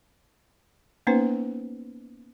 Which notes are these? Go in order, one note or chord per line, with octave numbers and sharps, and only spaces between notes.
A#3 B3 C#4 D#4 B4 C5